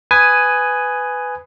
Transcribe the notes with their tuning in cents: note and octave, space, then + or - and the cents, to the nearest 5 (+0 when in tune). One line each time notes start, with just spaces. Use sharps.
B4 +10 G#5 +0 D#6 +0